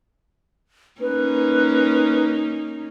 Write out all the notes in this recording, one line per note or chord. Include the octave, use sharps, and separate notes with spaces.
A#3 C#4 D#4 B4